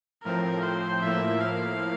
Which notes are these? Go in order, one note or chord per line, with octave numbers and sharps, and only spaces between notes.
A2 F3 C4 A#4
C5
A2 F3 A#3 E4 E5
F5